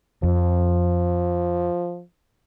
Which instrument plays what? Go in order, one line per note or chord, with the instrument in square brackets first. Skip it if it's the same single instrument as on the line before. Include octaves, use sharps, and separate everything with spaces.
[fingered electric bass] F2 [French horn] F3